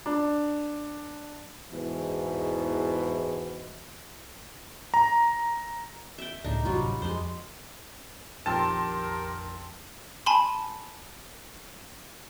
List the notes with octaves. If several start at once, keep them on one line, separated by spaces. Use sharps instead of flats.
D4
E2 G#2 B2 E3
A#5
E5 G5
C#2 A2 C#3 D4 D#4
A1 F#2 C3 F#3 G3 F4
F2 G#3 C5
A#1 F2 D#3 C4 G4 A#4 A5 C6
G#5 A5 B5 C6